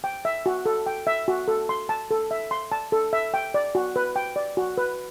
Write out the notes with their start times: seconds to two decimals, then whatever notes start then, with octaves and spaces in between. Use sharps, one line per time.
0.04 G5
0.25 E5
0.46 F#4
0.66 A4
0.86 G5
1.07 E5
1.28 F#4
1.48 A4
1.69 C6
1.89 A5
2.11 A4
2.31 E5
2.51 C6
2.72 A5
2.92 A4
3.13 E5
3.34 G5
3.54 D5
3.75 F#4
3.96 B4
4.16 G5
4.36 D5
4.57 F#4
4.78 B4